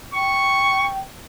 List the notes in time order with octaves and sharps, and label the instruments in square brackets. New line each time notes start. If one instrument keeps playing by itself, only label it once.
[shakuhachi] G5 [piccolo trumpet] C#6